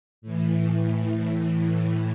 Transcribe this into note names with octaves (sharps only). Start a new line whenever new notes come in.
A2 E3